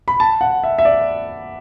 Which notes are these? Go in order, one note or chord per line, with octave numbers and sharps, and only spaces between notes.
B5
A5
F#5
E5
E5
D5